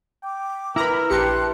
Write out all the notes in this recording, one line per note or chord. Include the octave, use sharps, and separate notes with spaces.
G5 D6
E4 A#4 B4 A#5 B5
A#1 G4 A5 C6 F#6 C#7